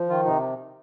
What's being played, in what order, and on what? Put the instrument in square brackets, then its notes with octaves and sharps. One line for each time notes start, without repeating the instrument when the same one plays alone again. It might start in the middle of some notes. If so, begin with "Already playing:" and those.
Already playing: [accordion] F3
D#3 F4
C3 D#4